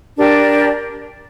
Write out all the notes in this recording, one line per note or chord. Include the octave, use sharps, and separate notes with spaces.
D4 G4 A#4 D5